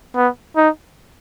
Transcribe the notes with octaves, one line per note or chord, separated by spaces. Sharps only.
B3
D#4